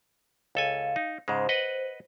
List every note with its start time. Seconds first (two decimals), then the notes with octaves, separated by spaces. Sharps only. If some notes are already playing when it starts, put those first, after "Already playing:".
0.55 C#2 A4 F5 G#5
0.96 D#4
1.28 G#2 C#3 G#3 C5
1.49 B4 D#5 F#5